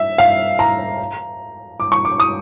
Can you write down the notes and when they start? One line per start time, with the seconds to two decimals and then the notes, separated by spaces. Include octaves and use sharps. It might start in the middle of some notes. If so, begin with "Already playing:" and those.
Already playing: E5
0.18 F5
0.59 A#5
1.80 D6
1.92 C#6
2.05 D6
2.20 D#6